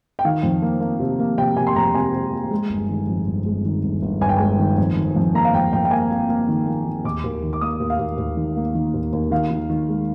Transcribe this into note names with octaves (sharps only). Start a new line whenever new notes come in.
G5
D#3 F5
F2
A#3
A#3
C3
A#3
C3 G5
C3 G#5
C6
F2 A#5
C3 G#5
C3
A#3
G#3
G1
D#3
F2
G1
G#3
D#3
G1
G1
G1 G#5
G5
G#3 G#5
D#3
F2
D#3
F2
A#3 A#5
F5
F2 G5
F2 G5
G5
A#3 G#5
A#3
A#3
D#3
A#3
D#3
D#2 D6
D#2
D#3
D6
A#3 D#6
D#2
F5
D#2
D#2
D#3
A#3
D#3
D#2
D#2
D#3 F5
D#3
D#3
G#3